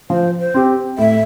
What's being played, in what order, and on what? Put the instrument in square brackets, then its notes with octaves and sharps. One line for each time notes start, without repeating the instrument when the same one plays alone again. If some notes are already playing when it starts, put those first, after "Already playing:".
[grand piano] F3 [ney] C5
[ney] C5
[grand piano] C4 G4
[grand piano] A2 [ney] E5